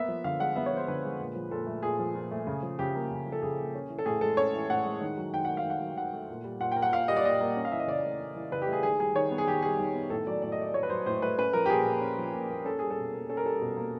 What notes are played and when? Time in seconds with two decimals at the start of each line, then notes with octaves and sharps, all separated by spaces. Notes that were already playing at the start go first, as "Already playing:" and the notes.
Already playing: A#3 B3 E5
0.08 F3
0.24 D3 F5
0.40 G#3 F#5
0.56 B3 E5
0.66 C#5
0.72 F3 C5
0.88 D3 B4
1.04 G#3
1.19 A#2
1.35 F3
1.51 A#2 A4
1.67 A3
1.83 A#2 G#4
1.99 F3
2.15 A#2
2.31 A3
2.47 C#3
2.63 F3
2.79 C#3 G4
2.95 A#3
3.11 C#3
3.26 F3
3.32 A4
3.42 C#3 G#4
3.59 A#3
3.75 C#4
3.89 E3
3.99 A4
4.05 A2 G#4
4.21 G#3 A4
4.37 C#4 C#5
4.54 E3
4.70 A2 F#5
4.86 G#3
5.01 D#3
5.17 F#3
5.34 D#3 G5
5.45 A3 F#5
5.57 F5
5.64 D#3
5.70 F#5
5.80 F#3
5.96 D#3 F#5
6.13 A3
6.29 A#2
6.44 G3
6.60 A#2 F#5
6.72 A#3 G5
6.82 F#5
6.92 A#2 F5
7.08 G3 D#5
7.16 D5
7.24 A#2 D#5
7.41 A#3
7.57 C#4
7.65 F5
7.72 E3 E5
7.79 D#5
7.87 C#3 D5
8.04 A3
8.19 C#4
8.35 E3
8.52 C#3 B4
8.62 G4
8.67 A3
8.73 G#4
8.83 D#3 G#4
8.99 G3 G#4
9.15 D#3 C#5
9.31 B3
9.38 G#4
9.47 D#3 G4
9.62 G3 G#4
9.79 D#3
9.94 B3
10.10 A2 A4
10.27 F#3 D5
10.42 A2 D5
10.52 D#5
10.59 A3 D5
10.74 A2 C#5
10.83 B4
10.90 F#3 C5
11.06 A2 C5
11.22 A3 B4
11.38 C#4 B4
11.53 F3 A#4
11.66 G4
11.70 A#2 G#4
11.86 A#3
12.01 C#4
12.18 F3
12.33 A#2
12.50 A#3
12.65 C#4 A4
12.79 G3 G#4
12.91 A4
12.97 B2
13.13 A#3
13.29 C#4 A4
13.37 A#4
13.45 G3 A4
13.61 B2
13.77 A#3